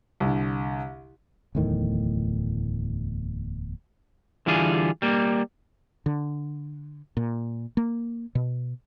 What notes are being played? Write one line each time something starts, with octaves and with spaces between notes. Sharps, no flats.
C2 D3
D1 E2 A2 D#3
D3 E3 G3 F4 G#4
G3 A#3
D3
A#2
A#3
B2